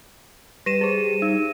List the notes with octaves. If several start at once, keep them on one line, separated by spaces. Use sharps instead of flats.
G3 B4 A#6 D#7 E7
G#4 C5
D#4